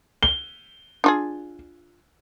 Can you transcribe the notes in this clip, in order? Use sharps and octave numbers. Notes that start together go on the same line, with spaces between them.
G7
D4 F4 G#4